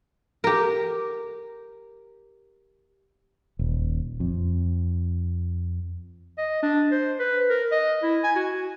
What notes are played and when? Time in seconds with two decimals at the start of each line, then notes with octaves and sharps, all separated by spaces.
0.44 G4 A#4
3.59 D#1
4.20 F2
6.38 D#5
6.63 D4
6.92 C5
7.19 B4
7.49 A#4
7.71 D#5
8.03 E4
8.24 G#5
8.36 F#4